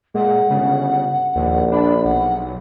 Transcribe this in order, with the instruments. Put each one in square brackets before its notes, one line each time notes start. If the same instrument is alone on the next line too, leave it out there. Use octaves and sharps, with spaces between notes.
[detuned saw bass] A#2 [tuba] G#3 [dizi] F#5
[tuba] G1 [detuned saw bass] C#3
[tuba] A#1 [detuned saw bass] D#2
[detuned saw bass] D4 [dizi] B5
[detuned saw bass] B1 [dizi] F#5